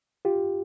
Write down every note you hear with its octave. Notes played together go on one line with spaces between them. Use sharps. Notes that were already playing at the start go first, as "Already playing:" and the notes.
F4 G4